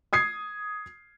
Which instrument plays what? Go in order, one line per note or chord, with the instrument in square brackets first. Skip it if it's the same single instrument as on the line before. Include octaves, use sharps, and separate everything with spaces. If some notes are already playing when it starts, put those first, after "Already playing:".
[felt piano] D#6 G#6 C7